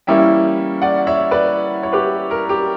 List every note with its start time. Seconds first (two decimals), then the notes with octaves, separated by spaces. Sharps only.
0.07 E3 G3 A#3 C#4 E4 E5 G5
0.82 D5 F#5
1.07 C#5 E5
1.31 B4 D5
1.83 C#5
1.93 G4 B4
2.31 A#4
2.49 G4